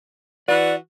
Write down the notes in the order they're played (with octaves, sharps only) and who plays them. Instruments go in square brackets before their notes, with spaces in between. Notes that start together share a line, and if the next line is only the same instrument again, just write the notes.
[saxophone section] E3 F#4 B4 [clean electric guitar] D5